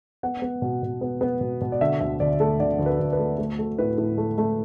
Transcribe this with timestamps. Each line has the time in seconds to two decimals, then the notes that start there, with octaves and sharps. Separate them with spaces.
0.23 B3 F#5
0.42 B3
0.62 B2
0.83 B2
1.01 B3
1.21 B3
1.41 B2
1.61 B2
1.72 D5
1.81 D3 E5
2.00 D2 E5
2.20 D2 D5
2.40 A3 A4
2.60 D3 D5
2.79 D2
2.86 B4
3.00 D2
3.13 B4
3.19 A3
3.38 A3 A4
3.59 A3
3.78 A2 B4
3.98 A2
4.17 A3
4.38 A3